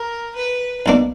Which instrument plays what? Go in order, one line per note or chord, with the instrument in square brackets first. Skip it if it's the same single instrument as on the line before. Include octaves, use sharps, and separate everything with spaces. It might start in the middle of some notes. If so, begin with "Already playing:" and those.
Already playing: [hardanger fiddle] A#4
B4
[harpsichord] B1 B2 A#3 D4